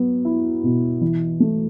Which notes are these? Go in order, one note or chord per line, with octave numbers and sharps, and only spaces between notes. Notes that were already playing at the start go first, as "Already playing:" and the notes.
Already playing: F#3 B3
E4
B2
E3
A3